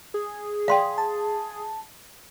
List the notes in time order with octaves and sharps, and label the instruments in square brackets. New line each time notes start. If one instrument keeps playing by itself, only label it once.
[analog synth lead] G#4
[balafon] D5 G5 [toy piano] F5 C6
[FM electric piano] A5